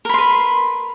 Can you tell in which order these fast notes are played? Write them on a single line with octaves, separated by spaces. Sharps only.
A#4 B5 C6 B4